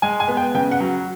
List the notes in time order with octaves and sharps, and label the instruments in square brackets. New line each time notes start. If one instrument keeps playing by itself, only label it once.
[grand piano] G#3 G#5
G#5
B3
G5
C#3 G5
F#5
F#3